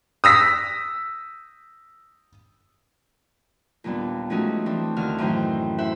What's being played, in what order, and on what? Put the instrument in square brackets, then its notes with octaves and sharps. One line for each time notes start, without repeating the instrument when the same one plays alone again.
[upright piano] D#6 E6 A#6 B6
[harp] D#2 A#2 G3 B3 D4
F3 G#3 A3 C#4 D#4 F#4
E3 C4 D4
D#2 D3 D#3 F#4 F6
F#2 A2 D#3 E3 C5 G5
E4 C5 E5 F#5